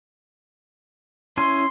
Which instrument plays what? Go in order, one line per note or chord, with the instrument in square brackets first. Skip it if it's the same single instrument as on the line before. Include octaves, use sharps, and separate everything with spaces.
[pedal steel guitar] C#4 E4 G#5 [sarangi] C6